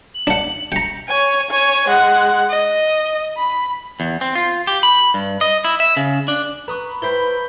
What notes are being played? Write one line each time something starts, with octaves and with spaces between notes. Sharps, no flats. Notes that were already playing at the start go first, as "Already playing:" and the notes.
F#7
D4 F#5
G5 A#5 C#7
C#5 G#5
C#5 G#5
G#3 F#5
D#5
B5
E2
C4
F4
G4
B5
G2
D#5
E4
E5
C#3
D4
B4 A#5 B5 C#6 D#6
E4 B4 C5 G5 G6 B6 G7